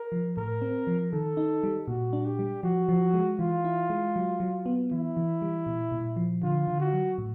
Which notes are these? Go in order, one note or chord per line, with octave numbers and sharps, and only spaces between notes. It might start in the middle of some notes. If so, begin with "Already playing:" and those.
Already playing: A#4
F3
A2 A#4
C4
F3
D#3 A4
D#4
G3
A#2 F#4
D4
G4
G3
F3 F#4
F3
G#3
E3 F4
E4
G#3
F#3
F#3
B3
E3 E4
E3
G3
A#2
A#2
F3
D3 F4
D3
F#4
F#3
A2